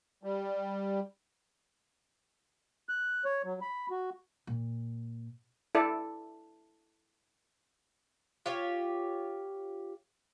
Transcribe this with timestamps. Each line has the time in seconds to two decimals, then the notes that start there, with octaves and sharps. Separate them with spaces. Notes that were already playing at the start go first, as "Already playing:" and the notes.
0.23 G3
2.89 F#6
3.25 C#5
3.44 F#3
3.61 B5
3.91 F#4
4.47 A#2
5.75 E4 A4 D5
8.46 F4 G4 C#5